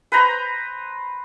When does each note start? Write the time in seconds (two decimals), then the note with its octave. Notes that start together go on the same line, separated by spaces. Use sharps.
0.12 B4 C5 A#5